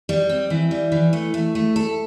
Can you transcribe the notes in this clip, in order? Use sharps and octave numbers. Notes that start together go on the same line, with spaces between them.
G3
C4
E3
G3
E3
A3
A3
A3
A4